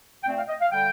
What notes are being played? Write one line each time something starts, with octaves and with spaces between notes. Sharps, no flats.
A#2 A3 C4 G5
F5
D#5
F5
D3 G3 G5